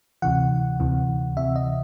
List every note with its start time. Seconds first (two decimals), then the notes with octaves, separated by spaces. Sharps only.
0.22 D2 C3 E3 F#5
0.80 D2 C3 E3
1.37 D2 C3 E3 E5
1.56 D#5